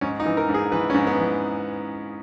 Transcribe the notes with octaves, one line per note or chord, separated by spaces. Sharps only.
G#2 C#4
D#4
E3
A#4
G#2
G#4
E3 B4
C#4
G#2
B3
E3